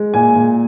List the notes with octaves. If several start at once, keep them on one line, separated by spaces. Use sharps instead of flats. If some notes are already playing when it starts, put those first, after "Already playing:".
Already playing: G#3
A#2 G#5
A#2